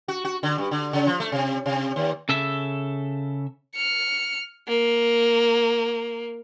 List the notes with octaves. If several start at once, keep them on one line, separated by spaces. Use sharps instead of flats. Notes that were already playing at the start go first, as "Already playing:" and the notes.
F#4
F#4
D3
G2
D3
C#3
F3
A3
C3
C3
D#2
C#3 A4 E5
F6 C#7
A#3